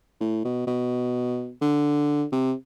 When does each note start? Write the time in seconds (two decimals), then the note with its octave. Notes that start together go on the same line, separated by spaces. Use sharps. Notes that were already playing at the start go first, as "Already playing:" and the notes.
0.20 A2
0.44 B2
0.67 B2
1.62 D3
2.32 C3